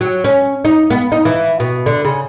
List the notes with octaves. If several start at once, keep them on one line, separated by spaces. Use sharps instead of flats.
F#3
C#4
D#4
B3
D#4
E3
B2
D3
C#3